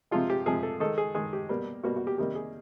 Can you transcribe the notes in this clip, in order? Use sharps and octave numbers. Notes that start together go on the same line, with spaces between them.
C3 F3 G#3 F4
G4
C3 F3 G#3 G#4
A4
D#3 G#3 A4
G#4
D#3 G#3 G#4
G4
B2 G3 A#3
B2 G3 A#3 F#4
F#4
G4
C3 D#3 G3 A#3 G4
G#4